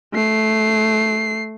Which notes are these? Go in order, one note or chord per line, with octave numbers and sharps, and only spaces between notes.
A3 C7